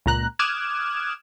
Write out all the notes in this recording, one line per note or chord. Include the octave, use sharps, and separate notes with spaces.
C#2 A#2 A#5 F#6
D6 D#6 F6 F#6 G#6 E7